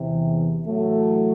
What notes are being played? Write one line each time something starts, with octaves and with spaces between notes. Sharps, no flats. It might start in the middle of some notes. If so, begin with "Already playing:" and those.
Already playing: E2 C3 E3
A2 E3 F#3 A3